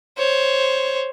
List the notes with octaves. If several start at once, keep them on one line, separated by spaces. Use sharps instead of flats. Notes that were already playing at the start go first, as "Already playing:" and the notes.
C5 C#5